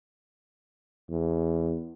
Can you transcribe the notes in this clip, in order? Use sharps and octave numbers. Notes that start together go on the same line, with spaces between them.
E2